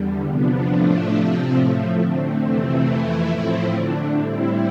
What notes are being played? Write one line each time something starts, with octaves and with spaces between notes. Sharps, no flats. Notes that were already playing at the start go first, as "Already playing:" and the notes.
Already playing: E2 D3 G3
C3 F3 B3 D4
A2 F3 A3 D4
C3 F3 C4
A2 F3 A3
D3 A3 C4
F2 C3 E3 A3 C4
F2 E3 A3 E4
A2 F3 A3 C4 E4
D3 A3 D4
A2 G3 C4 E4